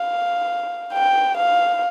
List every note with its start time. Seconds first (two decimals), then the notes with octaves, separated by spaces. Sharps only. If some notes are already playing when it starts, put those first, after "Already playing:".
Already playing: F5
0.94 G5
1.37 F5